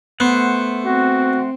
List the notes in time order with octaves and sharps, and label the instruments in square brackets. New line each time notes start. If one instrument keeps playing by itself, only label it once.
[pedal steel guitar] A3 C5 F#5 [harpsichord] B3
[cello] C4 [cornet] F#4